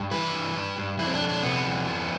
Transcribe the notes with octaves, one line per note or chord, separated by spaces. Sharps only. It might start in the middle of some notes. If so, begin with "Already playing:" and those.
Already playing: G2
E3 B4
G2
G2
G2
F2 E4
C4
D4
F2
D4
C3 B3
F2
F3